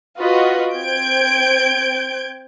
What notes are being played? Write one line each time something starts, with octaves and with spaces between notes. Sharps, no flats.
F4 F#4 B4 D#5
C4 G6 G#6 D7